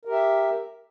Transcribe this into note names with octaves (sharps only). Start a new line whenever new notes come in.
G4 A#4 E5